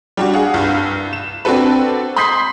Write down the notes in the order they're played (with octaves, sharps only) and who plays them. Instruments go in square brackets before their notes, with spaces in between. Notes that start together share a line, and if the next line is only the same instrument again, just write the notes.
[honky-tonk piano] G3 D4 F#4
G#4 F5 F#5
C2 G2
E7
C4 D4 F#4 A4 B4
B5 C6 D#6 G6 B6 C7